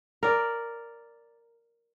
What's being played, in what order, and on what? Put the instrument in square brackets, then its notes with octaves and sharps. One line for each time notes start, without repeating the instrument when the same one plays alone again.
[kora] A#4 D5